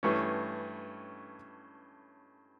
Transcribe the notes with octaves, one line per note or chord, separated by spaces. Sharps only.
G2 E3 A3 C#4